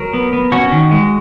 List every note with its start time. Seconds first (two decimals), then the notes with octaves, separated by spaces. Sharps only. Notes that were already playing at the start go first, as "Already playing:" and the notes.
Already playing: F#3 A#4
0.13 B3
0.33 B3
0.52 C#4 F#4
0.72 D#3
0.91 G#3